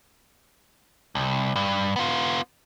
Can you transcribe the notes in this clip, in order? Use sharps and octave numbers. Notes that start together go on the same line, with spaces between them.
C2
G2
B3 F4